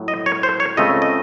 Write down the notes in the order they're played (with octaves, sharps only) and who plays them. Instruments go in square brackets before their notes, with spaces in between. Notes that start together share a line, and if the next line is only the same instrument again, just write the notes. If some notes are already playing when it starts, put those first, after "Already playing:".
Already playing: [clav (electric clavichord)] A2 F#3
D#5
C#5
C5
C#5
C#2 C#3 A3 C4 D#5
D#5